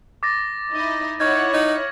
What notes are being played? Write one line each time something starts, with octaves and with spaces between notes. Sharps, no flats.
D6 A6 A#6
D#4 E4 D#5
D#4 E4 C#5 F#5 C#6 F6 G#6
D#4